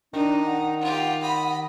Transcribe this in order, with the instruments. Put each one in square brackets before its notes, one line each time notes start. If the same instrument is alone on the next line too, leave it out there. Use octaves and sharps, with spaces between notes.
[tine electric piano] D#3 [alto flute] D4 [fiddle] D#4
[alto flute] F#5
[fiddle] F4 G4
D#5 B5